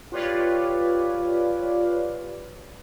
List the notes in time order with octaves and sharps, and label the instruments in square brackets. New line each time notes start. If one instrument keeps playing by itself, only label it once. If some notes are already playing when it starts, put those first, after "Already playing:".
[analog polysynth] F4 G4 B4 C#5 D5 F5